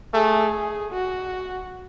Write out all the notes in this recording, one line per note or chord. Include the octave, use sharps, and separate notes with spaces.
A3 G#4
F#4